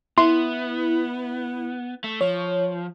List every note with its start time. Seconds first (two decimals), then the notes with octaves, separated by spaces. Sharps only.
0.18 B3 E4 C6
2.04 A3
2.21 F3 C#5